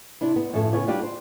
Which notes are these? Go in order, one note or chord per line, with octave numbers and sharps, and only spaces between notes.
C3 D4 E4
B3
F#2 A2 F3 A4 E5
C#3 B3 F4 C#5
G3 D4 F4 G4 G5
C5